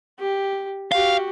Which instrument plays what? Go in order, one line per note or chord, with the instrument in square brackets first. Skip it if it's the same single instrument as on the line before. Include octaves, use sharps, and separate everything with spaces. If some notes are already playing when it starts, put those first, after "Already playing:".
[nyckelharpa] G4
[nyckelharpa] F#4 G4 [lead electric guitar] F5